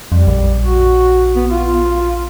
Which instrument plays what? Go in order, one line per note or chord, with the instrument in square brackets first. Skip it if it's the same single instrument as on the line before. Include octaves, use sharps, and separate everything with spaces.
[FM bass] F2 [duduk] G3
[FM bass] A#1
[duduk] F#4
B3
F4